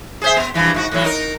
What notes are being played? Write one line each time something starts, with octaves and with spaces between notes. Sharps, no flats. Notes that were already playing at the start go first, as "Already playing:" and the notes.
G#4 C5 E5
B3
G2 E3 F3
G#2 F4 F#4
A2 E3 F#3
D#4 A#4